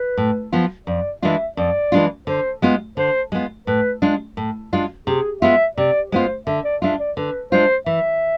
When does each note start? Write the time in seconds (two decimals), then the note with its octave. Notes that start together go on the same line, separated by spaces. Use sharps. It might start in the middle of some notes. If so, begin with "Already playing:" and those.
Already playing: B4
0.17 A2
0.52 F3 B3 F4
0.87 F2 D5
1.22 E3 G#3 D4 F4 E5
1.57 F2 D5
1.92 E3 G#3 D4 F4
2.27 D3 C5
2.62 G#3 B3 F4
2.97 D3 C5
3.32 G#3 B3 F4
3.67 A2 B4
4.02 G#3 D4 F4
4.37 A2
4.73 G#3 D4 F4
5.07 C3 G#4
5.42 G#3 B3 F4 E5
5.76 C3 D5
6.11 G#3 B3 F4 C5
6.47 D3 E5
6.64 D5
6.82 G#3 D4 F4 E5
7.00 D5
7.17 D3 B4
7.52 G#3 D4 F4 C5
7.86 E3 E5